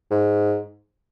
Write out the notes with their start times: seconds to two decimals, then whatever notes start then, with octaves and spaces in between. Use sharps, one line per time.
0.11 G#2